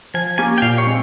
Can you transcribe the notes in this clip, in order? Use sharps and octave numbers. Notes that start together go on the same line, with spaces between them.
F3 G#5
A#3 C#4 G4 G#5
G5
A#2 F5
C#5
G#3 C4